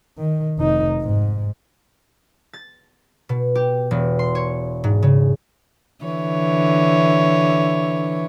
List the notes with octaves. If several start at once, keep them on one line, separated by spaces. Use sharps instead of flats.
D#3
F1 D#4
G#2
A6
B2
G4
E1
C6
C#5
G#2
C#3
D3 E3 C#5